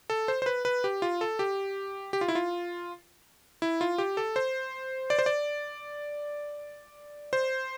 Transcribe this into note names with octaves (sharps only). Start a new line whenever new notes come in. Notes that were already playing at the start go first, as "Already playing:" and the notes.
A4
C5
C5
B4
B4
G4
F4
A4
G4
G4
F4
E4
F4
E4
F4
G4
A4
C5
D5
C5
D5
C5